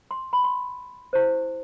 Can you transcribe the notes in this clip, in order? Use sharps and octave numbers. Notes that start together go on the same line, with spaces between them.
C6
B5
C6
E4 G4 C5